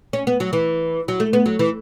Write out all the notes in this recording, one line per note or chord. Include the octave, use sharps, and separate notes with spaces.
C#4
B3
F#3
E3
F#3
A3
B3
F#3
E3